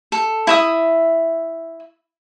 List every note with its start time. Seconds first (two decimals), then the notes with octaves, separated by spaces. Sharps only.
0.12 A4
0.47 E4 E5 D#6